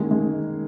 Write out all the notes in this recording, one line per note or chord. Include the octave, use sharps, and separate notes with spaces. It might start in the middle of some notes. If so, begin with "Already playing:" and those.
Already playing: D#3 G#3 A#3
G#3